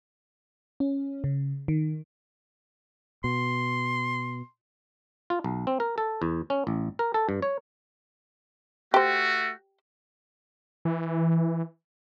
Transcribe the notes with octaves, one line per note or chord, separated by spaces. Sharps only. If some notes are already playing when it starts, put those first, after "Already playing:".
C#4
C#3
D#3
B2 C6
F4
B1
C4
A#4
A4
E2
C#4
A1
A#4
A4
G2
C#5
A3 F#4 G4 C5
E3